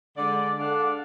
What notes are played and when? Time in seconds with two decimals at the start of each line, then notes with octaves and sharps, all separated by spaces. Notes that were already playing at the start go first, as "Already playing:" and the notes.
0.17 D3 G#3 D5
0.59 D4 A4 D5 F5 F#5